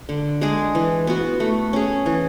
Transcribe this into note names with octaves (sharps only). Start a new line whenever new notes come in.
D3
G#3 D4 G#4
E3
B3 F#4
A3
C#4 G#4
E3